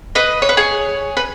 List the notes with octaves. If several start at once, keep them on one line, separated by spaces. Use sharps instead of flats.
B4 D#5
C#5
B4
G#4 C#5
B4